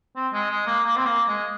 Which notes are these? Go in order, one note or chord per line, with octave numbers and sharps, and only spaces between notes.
C4
G#3
G#3
A#3
A#3
C4
A#3
G#3